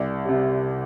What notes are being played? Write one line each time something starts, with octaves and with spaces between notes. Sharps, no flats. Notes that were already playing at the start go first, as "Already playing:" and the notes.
Already playing: C2 D5
C3 G3